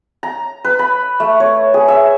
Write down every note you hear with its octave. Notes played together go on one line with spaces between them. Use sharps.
A#5
B4
B5
A3
C#5
G#4
E5